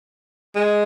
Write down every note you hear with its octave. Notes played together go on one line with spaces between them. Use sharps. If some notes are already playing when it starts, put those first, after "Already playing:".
G#3